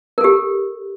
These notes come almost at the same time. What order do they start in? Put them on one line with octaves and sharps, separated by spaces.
A#4 A4 G4